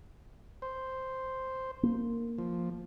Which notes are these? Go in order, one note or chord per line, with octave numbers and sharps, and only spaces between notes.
C5
A#3
F3